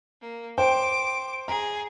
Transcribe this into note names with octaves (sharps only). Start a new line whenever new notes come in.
A#3
C5 G5 D6 D7
G#4 A#5